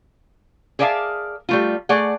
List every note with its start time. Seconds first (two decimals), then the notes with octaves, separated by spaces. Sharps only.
0.79 G#4 A#4 D5 E5 F5 A5
1.49 G3 A3 F4
1.89 A3 G#4 D5 F#5